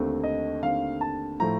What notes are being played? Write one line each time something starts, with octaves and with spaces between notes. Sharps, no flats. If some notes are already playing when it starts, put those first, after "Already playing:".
Already playing: D#2 D3 A3 C4
D#5
D#2 D3 A3 C4 F5
A5
A2 F3 A3 A#5